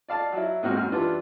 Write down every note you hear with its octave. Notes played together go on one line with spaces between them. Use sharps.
D5 F5 A5
F#3 E4
G#2 A#3 C4 F#4 F6
F#2 F6
E3 G3 D4 F4